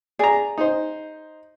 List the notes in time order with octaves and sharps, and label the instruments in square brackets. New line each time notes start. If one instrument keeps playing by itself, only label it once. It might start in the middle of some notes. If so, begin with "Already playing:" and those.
[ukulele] G#4 [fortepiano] D5 A#5
[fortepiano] D#4 C5